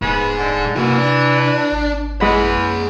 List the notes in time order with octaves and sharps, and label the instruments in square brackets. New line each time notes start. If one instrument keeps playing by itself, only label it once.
[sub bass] D#1 [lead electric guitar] G#2 G#4 [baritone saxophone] B3
[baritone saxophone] D3
[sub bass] C3 [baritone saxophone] E3 [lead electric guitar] A#3 F#4
[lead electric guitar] D4
[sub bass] G#1
[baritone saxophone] E3 [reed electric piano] G#3 B5 [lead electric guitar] G#4 F#5